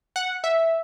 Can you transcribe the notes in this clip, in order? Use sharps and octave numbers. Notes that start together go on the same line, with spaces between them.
F#5
E5